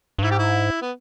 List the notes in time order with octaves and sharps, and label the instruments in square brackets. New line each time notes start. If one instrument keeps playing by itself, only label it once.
[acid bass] G2
[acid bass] G#2 [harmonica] E4
[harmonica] G4
E4
B3